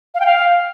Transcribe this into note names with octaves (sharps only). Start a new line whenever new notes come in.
F5
G5
F5